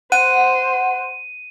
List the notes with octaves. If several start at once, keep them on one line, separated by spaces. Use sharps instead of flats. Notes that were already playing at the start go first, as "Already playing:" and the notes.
C5 F#5 D#7